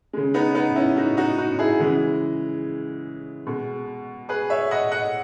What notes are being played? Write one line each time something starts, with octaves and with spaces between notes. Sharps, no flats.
C#3 G#3
B3 D#4
B3 D#4
C#4 E4
D#4 F#4
D#4 F#4
D#4 F#4
E4 G#4
C#3 E3 G#3
B2 G#3
G#4 B4
C#5 E5
D#5 F#5
D#5 F#5